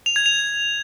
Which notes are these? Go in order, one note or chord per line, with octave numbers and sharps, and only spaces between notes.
F7
G#6
F7